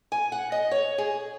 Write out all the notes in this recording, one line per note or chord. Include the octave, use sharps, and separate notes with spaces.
G#5
F#5
D#5
C#5
G#4